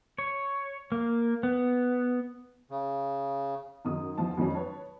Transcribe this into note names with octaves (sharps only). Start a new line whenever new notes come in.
C#5
A#3
B3
C#3
F#2 D#3 D#4 D#6
E2 F3 A5
F2 D#3 F#3 G#3 C#4
B4 C#5 A5